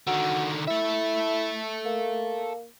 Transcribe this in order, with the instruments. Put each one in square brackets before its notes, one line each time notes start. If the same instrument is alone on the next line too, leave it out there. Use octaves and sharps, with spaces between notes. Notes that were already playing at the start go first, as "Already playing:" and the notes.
[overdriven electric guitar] D3 D#3 [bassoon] F#4
[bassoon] E4 [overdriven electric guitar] A4 E5
[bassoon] A#3